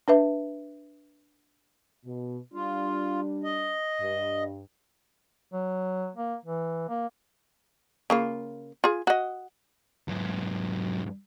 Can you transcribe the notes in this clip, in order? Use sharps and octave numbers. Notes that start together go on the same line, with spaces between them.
D4 B4 E5
B2
G3 D4 F4
D#5
G2
F#3
A#3
E3
A#3
C#3 A#3 F4
F4 G#4
F#4 D#5
G#2 F#3